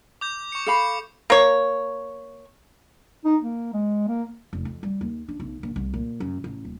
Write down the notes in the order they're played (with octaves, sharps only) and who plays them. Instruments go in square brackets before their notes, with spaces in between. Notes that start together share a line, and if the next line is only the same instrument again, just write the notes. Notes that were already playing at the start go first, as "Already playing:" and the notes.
[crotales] D6 G6
C#6 C#7
[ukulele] A4 F5 B5 [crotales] C#6 D6 C#7
[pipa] A#3 C#5
[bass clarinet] D#4
A#3
G#3
A#3
[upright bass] F1
F2
G3
D#2
D4
B1
A#1
C2
A#2
F#2
A1
D#1